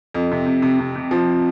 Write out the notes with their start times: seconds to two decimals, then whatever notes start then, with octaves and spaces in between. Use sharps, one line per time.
0.14 F2
0.31 C3
0.46 C3
0.62 C3
0.79 C3
0.96 C3
1.11 F3